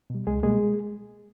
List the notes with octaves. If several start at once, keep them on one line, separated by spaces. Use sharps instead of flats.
B2 G3
C#2 G#3 G#4
B2 G3 G#3 A#3 G#4